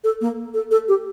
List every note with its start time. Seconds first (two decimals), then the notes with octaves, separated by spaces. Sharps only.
0.04 A4
0.21 A#3
0.54 A4
0.71 A4
0.88 G4